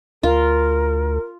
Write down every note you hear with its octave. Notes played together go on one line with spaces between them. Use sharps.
D2 F4 A#4